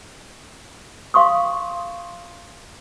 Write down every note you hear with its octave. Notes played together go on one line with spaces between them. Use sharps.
F5 C6 C#6 D#6